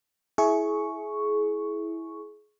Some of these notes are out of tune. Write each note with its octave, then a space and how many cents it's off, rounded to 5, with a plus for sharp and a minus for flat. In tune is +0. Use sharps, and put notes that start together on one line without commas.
E4 -5 G#4 +25 C#6 +0